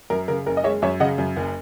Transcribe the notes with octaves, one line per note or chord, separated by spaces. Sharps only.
F#2 A#4
C#3 A#4
F#1 A#4
D#5
G#3 C#5 E5
F#2 C#5 E5
C#3 D#5 F#5
F#2
F#1